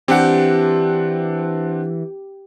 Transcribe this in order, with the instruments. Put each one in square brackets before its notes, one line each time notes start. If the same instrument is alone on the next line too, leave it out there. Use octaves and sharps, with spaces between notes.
[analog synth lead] E3 [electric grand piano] C4 D4 F#5 [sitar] G4